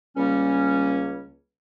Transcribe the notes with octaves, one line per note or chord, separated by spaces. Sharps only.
C#2 G3 A#3 C#4